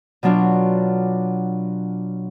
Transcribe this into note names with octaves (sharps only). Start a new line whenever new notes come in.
B2 F#3 D4 F4